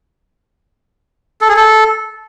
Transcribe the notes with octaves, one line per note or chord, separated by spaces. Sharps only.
A4
G#4
A4